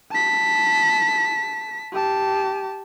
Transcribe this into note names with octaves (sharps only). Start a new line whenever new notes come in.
A5 B6
G4 A5